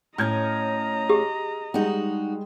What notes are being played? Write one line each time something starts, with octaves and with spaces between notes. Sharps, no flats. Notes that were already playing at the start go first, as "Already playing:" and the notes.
A2 C#4 D#5 A#5 F6 G6 G#6
G4 G#4
G3 G#3 D#4 F#4